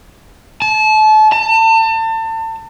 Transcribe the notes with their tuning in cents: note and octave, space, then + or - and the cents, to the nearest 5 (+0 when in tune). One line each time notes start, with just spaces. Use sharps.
A5 -30
A5 +35